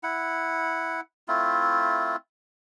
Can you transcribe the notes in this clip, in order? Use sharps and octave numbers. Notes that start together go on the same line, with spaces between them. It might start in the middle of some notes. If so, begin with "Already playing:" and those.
E4 F#5
A3 C4 E4 F4